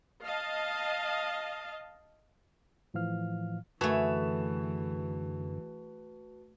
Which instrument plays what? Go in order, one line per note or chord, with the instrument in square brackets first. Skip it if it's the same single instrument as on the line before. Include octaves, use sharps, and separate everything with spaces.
[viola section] D#5 F5 A5
[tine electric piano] A2 E3 F3 F5 F6
[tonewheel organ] F#2 D3 [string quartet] E3 [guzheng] A3 G#4 [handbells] F#4 B4 A5